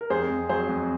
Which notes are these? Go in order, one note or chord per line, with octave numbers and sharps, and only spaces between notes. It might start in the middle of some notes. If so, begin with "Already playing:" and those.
A#4
F2 G#4 C5
F2
F#3 G#4 C5
F2